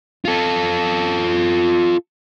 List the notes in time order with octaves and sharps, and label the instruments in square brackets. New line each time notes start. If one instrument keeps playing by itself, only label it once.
[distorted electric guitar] F4 A4